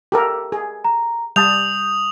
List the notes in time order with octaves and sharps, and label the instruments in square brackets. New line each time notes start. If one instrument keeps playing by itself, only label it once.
[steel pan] G4 A4 A#4
G#4
[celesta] A#5
[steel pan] G3 A5 [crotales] D#6 F7 [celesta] G6